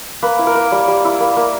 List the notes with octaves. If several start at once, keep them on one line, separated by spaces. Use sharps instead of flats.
A#3 B4
E4
A#4
A#3
G3
G3
E4
A#3
A#3